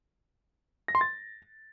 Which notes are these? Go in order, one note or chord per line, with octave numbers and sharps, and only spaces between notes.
A#6
C6
A6